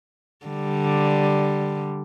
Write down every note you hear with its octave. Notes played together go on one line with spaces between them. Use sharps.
D3 G3